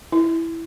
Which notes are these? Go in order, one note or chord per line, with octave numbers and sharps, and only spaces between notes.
E4